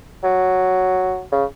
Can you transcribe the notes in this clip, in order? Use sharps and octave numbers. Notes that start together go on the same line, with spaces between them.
F#3
C#3